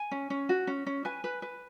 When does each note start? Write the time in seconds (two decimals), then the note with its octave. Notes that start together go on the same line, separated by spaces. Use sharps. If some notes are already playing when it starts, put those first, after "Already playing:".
Already playing: G#5
0.11 C#4
0.30 C#4
0.49 F#4
0.67 C#4
0.86 C#4
1.05 B4 G#5
1.24 B4
1.42 B4